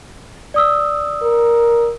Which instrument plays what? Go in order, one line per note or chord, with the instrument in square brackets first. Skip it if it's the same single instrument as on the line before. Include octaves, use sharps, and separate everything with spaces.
[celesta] D5 D#6 E6
[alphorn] A#4